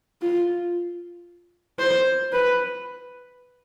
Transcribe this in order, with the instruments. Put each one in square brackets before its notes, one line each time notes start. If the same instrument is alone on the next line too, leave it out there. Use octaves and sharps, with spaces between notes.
[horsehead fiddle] F4
C5
B4